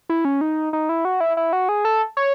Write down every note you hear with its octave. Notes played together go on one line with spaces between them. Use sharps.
E4
C#4
D#4
D#4
E4
F#4
E4
E4
F#4
G#4
A4
C#5